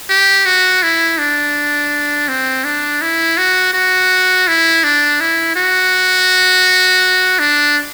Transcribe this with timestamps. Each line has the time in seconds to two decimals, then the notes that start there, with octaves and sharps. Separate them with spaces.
0.10 G4
0.46 F#4
0.83 E4
1.18 D4
2.28 C4
2.64 D4
3.01 E4
3.38 F#4
3.74 F#4
4.48 E4
4.84 D4
5.21 E4
5.56 F#4
7.40 D4